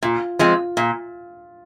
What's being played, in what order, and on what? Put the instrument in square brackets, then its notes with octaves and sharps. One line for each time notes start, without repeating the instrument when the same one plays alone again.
[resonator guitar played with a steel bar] A#2 [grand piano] F4
[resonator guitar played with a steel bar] F3 G#3 C4 [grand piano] F4
[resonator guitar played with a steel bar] A#2